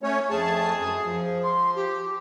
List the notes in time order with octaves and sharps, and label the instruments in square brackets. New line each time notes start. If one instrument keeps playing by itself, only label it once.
[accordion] A3 C#4 C#5
[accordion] F2 A3 A5 [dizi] G#4
[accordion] F#2
F3
[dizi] C6
G4